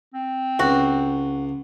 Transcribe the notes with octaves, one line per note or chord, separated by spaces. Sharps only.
C4
C#2 F#4